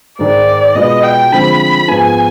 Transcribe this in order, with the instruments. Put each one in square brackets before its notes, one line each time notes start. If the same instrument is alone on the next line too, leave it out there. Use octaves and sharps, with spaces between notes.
[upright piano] G#2 D#3 G#3 [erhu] D5
[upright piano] B2 G#3 B3 F4 [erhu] D#5
[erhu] G5
[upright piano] D3 F3 G#3 C4 [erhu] B5
[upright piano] G#2 F3 G#3 B3 F4 [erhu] G#5